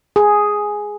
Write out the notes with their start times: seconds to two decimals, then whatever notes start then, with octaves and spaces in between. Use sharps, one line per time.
0.16 G#4